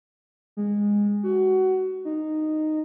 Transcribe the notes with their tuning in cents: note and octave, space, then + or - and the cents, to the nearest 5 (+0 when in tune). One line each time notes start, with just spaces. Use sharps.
G#3 -15
F#4 +20
D#4 -10